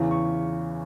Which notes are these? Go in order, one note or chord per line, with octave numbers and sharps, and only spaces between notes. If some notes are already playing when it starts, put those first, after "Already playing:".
Already playing: E2 C#3 E3
C#6